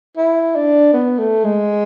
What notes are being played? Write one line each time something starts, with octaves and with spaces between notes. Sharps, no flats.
E4
D4
B3
A3
G#3